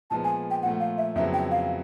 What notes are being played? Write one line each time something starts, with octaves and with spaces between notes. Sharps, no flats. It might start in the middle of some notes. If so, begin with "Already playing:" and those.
A#2 F3 G#3 B3 A5
G#5
G5
A#2 F3 A3 F#5
F5
E5
F2 C#3 F#3 B3 E4 E5
G5
F5